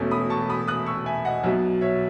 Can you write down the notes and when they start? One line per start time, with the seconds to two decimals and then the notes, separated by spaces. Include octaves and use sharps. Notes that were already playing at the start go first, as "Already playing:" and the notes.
Already playing: E1 E2 B2 A3 C#4
0.11 B5 D#6
0.30 A5 C#6
0.50 B5 D#6
0.68 D#6 F#6
0.86 C#6 E6
1.06 E5 G#5
1.25 D#5 F#5
1.43 B1 B2 F#3 C#5 E5
1.81 C#5 E5